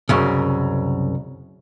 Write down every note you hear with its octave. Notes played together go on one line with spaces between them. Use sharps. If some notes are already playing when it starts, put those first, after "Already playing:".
C2 F#2 C#3